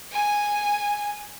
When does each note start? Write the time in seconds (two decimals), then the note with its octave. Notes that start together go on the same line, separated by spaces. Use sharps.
0.12 G#5